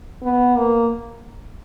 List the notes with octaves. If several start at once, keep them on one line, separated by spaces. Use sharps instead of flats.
B3
A#3